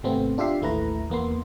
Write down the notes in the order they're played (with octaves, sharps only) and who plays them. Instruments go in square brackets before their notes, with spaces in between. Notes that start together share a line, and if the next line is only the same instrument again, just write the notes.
[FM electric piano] G#1 C3 A3 B3 C4
D4 F4 G4 E5 C7
A1 D#2 A3 E4 B4 A#5
E2 A#3 B3 C6